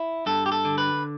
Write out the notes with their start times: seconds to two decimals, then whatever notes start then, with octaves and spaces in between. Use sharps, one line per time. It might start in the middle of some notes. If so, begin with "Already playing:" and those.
Already playing: E4
0.26 G2 A4
0.46 G4
0.52 A4
0.65 D3
0.78 B4